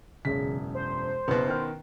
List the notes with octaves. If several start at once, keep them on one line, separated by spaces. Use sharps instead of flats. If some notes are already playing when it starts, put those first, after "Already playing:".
E1 F#2 C#3 B6
C5
F#1 B2 B3
D#3 F6